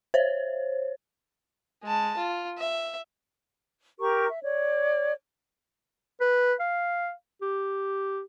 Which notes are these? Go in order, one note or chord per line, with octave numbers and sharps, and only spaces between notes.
C5 C#5
G#3 A5
F4
E5
G4 A#4 A#5 C#6
E5
C#5 D5
B4
F5
G4